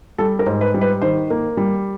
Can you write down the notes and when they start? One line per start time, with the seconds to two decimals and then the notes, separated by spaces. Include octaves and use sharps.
0.18 G3 A4
0.39 A#4
0.46 G#2
0.61 B4
0.74 G3
0.81 B4
1.02 D#3 C5
1.30 A#3
1.57 G3